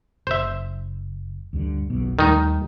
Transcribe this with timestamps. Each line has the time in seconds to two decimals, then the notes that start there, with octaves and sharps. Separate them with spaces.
0.27 F#1 C5 E5
1.53 D2 G2 D3
1.90 F#1 B1 B2
2.19 D#2 D#3 G3 A3 D#4